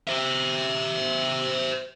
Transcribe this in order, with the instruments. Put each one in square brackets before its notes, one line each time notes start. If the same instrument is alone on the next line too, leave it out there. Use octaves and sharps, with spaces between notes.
[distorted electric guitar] C5 E5